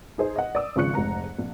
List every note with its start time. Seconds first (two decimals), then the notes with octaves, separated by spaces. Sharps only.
0.18 D#4 G#4 C5
0.36 D#5 F#5
0.55 D5 D#6 E6
0.76 G#1 C#3 F3 C#6 F#6 C#7
0.94 F1 G#2 A#5 F#6
1.38 A#1